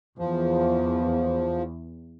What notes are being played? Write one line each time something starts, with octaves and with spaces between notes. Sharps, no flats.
E2 F3